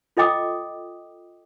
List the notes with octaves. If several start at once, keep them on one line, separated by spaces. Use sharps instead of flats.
F4 A4 D#5 G5 D6 D#6